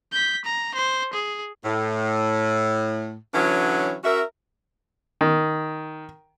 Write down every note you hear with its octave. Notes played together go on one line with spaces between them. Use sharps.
G6 B6
A#5
C5
G#4
A2
D3 E3 F#3 C#4
C#4 F#4 A#4 E5
D#3